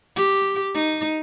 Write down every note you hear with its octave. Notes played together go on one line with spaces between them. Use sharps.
G4
D#4